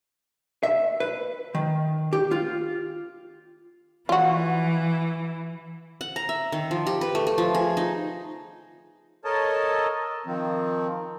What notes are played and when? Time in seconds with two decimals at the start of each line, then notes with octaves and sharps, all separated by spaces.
0.63 E5
1.00 B4
1.55 D#3
2.13 G4
2.31 F4
4.09 E3 F4 F#4
6.01 F#5
6.16 A#5
6.29 E5
6.52 D#3
6.71 F3
6.87 G4
7.01 B4
7.15 A3
7.27 A3
7.38 F3
7.55 G#4
7.77 D#4
9.25 A4 A#4 C#5 D#5 A5
10.26 D#3 F3 C4